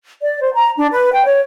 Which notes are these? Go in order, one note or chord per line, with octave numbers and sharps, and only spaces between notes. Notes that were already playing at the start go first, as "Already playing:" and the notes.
D5
C5
A#5
D4
B4
G5
C#5